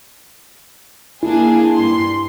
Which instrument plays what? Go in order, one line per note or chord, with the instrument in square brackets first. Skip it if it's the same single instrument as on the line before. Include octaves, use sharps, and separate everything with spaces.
[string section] A#3 D4 G#4 [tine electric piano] E4
[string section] G2 C6